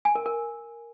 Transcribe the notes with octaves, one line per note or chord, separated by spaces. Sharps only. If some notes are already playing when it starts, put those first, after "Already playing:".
G#5
A#4
A#4